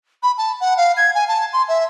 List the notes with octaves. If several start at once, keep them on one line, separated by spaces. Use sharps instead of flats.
B5
A5
F#5
F5
G#6
G#5
A5
C6
E5